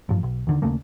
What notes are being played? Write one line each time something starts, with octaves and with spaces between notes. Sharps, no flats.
A1 G2 F3
B1
D#2 D3 D#3
D#2 C#3 A3 A#3